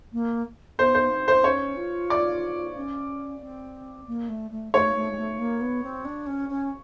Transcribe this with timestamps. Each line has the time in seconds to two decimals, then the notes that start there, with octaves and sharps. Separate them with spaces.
0.13 A#3
0.78 B3 C5
0.95 C5
1.12 C4
1.28 C5
1.44 C#4 C#5
1.76 F4
2.10 D5
2.76 C#4
3.41 C4
4.07 A#3
4.29 A3
4.51 A3
4.73 A3 C#5
4.95 A3
5.12 G#3
5.17 A3
5.39 A#3
5.61 B3
5.83 C4
6.05 D4
6.27 C#4
6.49 C#4